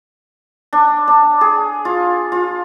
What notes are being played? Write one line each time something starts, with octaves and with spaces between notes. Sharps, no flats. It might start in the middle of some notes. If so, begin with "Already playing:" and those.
D4
D4
G#4
F4
F4